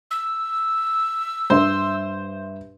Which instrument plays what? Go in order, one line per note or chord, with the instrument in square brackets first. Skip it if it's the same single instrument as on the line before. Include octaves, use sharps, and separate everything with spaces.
[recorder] E6
[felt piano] G2 E5 [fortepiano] C5